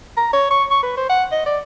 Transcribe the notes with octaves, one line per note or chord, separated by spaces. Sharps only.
A#5
C#5
C#6
C#6
B4
C5
F#5
D#5
D5